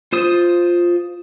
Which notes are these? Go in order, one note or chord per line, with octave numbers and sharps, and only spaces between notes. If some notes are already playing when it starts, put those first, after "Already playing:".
F4 C5 D#6